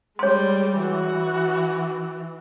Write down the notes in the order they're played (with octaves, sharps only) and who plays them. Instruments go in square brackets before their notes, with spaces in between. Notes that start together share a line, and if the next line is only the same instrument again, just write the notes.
[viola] G3 G#3 [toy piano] C#5 C6
[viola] E3 [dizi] F#4